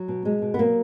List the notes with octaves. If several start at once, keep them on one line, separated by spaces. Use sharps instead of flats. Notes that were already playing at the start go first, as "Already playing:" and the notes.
Already playing: F#3
B2
B2 G#3
B2
B3
F#3 A#3